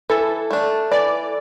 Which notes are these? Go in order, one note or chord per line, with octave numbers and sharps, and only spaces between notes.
E3 A4
A3 D4
E3 D5